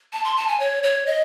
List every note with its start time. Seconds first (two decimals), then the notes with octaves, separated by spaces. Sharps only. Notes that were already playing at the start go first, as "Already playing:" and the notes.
0.13 A5
0.24 C6
0.37 A5
0.48 G#5
0.60 C#5
0.83 C#5
1.07 D#5